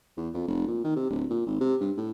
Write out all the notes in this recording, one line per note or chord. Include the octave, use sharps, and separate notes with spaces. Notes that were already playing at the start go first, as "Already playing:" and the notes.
E2
F2
F1
A#2
D#3
C3
D1
A#2
G#1
C3
G2
A2